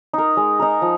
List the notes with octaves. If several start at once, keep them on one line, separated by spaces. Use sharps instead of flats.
D#4 A#4
G#3
D#4 A#4
F3